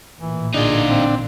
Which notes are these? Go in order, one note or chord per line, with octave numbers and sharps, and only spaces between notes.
A1 A#2 E3
D3 D4 D#4 F4 G#4
C4